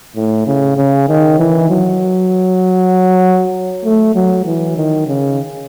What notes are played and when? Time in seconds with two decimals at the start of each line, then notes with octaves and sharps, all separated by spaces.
0.16 A2
0.47 C#3
0.77 C#3
1.08 D#3
1.39 E3
1.70 F#3
3.84 A3
4.15 F#3
4.45 E3
4.77 D#3
5.07 C#3